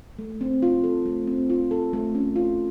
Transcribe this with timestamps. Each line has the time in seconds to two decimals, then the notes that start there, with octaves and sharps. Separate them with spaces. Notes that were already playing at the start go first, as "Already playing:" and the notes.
0.19 A3
0.41 C4
0.62 F4
0.84 A4
1.05 A3
1.27 C4
1.50 F4
1.71 A4
1.93 A3
2.15 C#4
2.36 F4